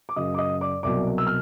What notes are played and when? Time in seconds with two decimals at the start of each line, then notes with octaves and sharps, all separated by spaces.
0.09 D6
0.16 F#2 C#3 F#3 D#5 D#6
0.34 D6
0.38 D#5 D#6
0.61 D5 D6
0.83 C2 B2 F#3 D5 D6
1.18 E6
1.27 F6